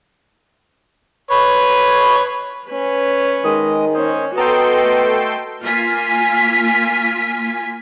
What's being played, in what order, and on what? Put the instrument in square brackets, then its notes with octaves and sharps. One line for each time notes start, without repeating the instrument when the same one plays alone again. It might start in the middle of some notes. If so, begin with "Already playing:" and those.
[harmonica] B4 C#5
[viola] C#4 B4
[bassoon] D#3 [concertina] G#3 D#5 D#6
[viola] C#4 [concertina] C5 D#5
[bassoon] B3 [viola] F#4 D#5 [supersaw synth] A4 G5 C6 [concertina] A#5 D#6
[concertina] A3
[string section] A#3 F4 G#5 B6